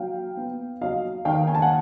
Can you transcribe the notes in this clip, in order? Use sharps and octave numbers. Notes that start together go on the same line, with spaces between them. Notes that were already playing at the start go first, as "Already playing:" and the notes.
Already playing: F#3 F5 G5
B3
F#3 D#5 F5
D#3 F5 G5
G#5
A5
F#5 G#5